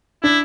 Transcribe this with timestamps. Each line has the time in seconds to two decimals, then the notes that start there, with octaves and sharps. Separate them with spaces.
0.23 D4 E4